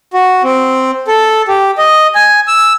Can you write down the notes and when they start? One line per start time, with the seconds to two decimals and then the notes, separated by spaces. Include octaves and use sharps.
0.13 F#4
0.44 C4
1.08 A4
1.48 G4
1.78 D#5
2.15 G#5
2.48 E6